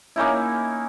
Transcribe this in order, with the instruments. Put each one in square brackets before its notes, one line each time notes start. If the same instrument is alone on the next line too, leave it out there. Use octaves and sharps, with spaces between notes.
[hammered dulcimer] A#3 C#4 D#4 E4